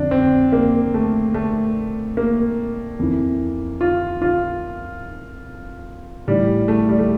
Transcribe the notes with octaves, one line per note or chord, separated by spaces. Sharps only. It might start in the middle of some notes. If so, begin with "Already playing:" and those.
Already playing: F2 D3 D4
C4
A#3
A3
A3
A#3
F2 E3
F4
F4
A2 E3 G3
A3
G3
A3